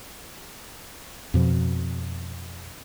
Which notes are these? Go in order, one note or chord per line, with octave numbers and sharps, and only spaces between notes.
F2 B2 F3